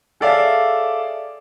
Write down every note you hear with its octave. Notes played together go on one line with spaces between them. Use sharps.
G#4 A4 C#5 D5 E5 F5